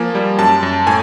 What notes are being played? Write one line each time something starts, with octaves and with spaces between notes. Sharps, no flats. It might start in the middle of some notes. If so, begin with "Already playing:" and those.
Already playing: F3 A#3 G#5
G3
F#2 A5
F#2
A2 G#5